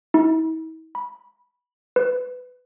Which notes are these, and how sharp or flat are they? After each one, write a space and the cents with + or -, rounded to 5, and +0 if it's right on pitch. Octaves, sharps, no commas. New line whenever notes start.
E4 -45
B5 -10
B4 +15